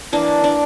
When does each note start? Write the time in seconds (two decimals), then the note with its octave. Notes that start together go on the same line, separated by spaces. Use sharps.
0.12 E3 A#3 D4
0.44 D4